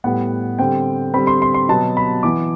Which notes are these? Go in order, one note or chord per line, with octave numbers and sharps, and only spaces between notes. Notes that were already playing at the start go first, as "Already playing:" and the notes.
A2 G3 B3 F#5
D3 G3 C4 G5
D3 G3 C4 B5
C6
C6
C6
B2 F#3 B3 A5
B5
E3 B3 D6